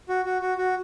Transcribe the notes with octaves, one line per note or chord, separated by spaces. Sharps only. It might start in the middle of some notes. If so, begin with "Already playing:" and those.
F#4
F#4
F#4
F#4